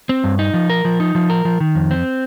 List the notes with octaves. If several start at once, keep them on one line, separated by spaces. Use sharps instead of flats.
C4
G2
D#4
F3
A#4
F3
D#4
F3
A#4
F3
D#3
F2
C4